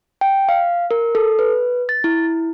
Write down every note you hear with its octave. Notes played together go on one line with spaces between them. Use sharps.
G5
F5
A#4
A4
B4
A6
E4